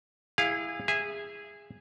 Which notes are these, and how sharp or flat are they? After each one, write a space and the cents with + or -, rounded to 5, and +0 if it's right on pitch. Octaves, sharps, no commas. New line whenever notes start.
E4 +0 G#4 -25 F5 +10
G#4 -15 E5 +0